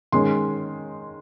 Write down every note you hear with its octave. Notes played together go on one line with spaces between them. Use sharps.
D#3 G#3 C#4 C6